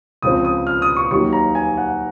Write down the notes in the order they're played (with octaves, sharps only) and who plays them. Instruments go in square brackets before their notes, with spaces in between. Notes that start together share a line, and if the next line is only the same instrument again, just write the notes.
[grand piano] C#2 C#3 F3 C4 D#6
D#6
F6
D#6
C#6
D#2 D#3 F#3 A#3 C#6
A#5
G#5
F#5